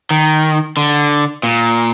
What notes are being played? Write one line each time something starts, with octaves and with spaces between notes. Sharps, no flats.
D#3
D3
A#2